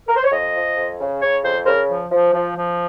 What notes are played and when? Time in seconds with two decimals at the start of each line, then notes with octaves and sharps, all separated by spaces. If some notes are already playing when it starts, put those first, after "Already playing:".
0.09 A#4
0.16 C5
0.24 C#5
0.32 F2 D#5
0.54 F3
0.77 F2
0.99 C#3
1.22 C#3 C#5
1.44 F2 C5
1.63 C5
1.66 C#3 A#4
1.89 F3
2.11 F3
2.34 F3
2.57 F3